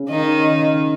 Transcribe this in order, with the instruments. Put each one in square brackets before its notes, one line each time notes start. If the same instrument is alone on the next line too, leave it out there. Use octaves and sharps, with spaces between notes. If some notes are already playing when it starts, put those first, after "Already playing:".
Already playing: [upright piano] C#3
[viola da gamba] D#3 D#4